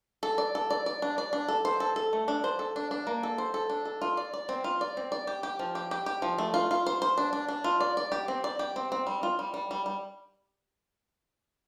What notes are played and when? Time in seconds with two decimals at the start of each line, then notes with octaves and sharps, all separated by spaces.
0.23 A4
0.38 D5
0.55 A4
0.70 D5
0.86 D5
1.02 D4
1.18 D5
1.33 D4
1.48 A4
1.65 C5
1.80 A4
1.96 A4
2.13 A3
2.28 D4
2.44 C5
2.59 A4
2.76 D4
2.91 D4
3.07 A#3
3.23 A4
3.38 C5
3.54 A4
3.70 D4
3.85 A4
4.02 F4
4.17 D5
4.33 D5
4.49 C4
4.64 F4
4.81 D5
4.97 C4
5.12 D5
5.27 G4
5.43 G4
5.59 F3
5.75 G4
5.91 G4
6.06 G4
6.22 F3
6.38 A3
6.54 F4
6.71 F4
6.87 C5
7.02 C5
7.18 D4
7.33 D4
7.48 D4
7.64 F4
7.80 D5
7.97 D5
8.12 G4
8.28 C4
8.44 D5
8.59 G4
8.76 C4
8.92 C4
9.07 G3
9.23 F4
9.39 G3
9.54 G3
9.71 G3
9.86 G3